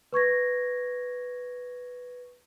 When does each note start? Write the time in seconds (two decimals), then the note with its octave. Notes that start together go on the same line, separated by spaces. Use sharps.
0.12 B4 C#6 G#6 A#6